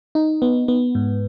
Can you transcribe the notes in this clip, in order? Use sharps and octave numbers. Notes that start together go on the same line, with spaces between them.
D#4
B3
B3
G#2